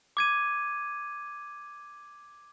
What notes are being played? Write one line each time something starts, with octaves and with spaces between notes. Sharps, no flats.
D6 G#6 D#7